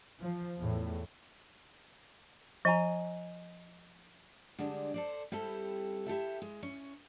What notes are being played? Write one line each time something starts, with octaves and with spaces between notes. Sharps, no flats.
F3
E2 A2
F3 D#5 G#5 A#5
D3 G3 G#3 D4
A4 C5 D5
G3 C4 E4 G4 A4
E4 G4 A4 E5
G#3
C#4 C#5